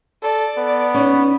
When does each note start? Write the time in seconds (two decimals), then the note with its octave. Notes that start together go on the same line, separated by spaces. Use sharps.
0.23 A4 D5
0.58 B3
0.94 C#4 D#4